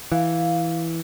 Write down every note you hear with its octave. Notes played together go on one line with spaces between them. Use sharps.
E3 F5